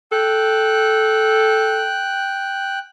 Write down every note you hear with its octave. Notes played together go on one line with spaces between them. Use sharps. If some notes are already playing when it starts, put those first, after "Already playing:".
A4 G5 F#6